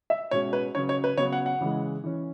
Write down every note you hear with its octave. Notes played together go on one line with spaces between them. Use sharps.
E5
B2 G#3 C#4 C#5
B4
C#3 F#3 C#4 C#5
C#5
B4
C#3 F#3 B3 C#5
F#5
F#5
C#3 E3 G#3
E3 C#4